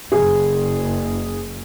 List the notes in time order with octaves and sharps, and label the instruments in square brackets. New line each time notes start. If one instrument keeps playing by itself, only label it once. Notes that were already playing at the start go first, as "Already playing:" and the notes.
[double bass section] F#1 [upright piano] G#4